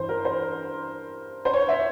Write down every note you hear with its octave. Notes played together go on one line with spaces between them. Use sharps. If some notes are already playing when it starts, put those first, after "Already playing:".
Already playing: G2 E3 C5
A#4
C5
C5
C#5
E5